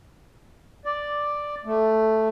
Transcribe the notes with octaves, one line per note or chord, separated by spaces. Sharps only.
D5
A3